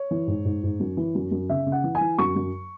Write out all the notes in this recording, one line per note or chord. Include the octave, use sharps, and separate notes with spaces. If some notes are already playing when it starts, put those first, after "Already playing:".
Already playing: C#5
E3
G#2
G#2
G#2
F#2
E3
F#2
F#2
C#3 E5
C#3
F#5
E3
G#5
E3
F#2 C#6
F#2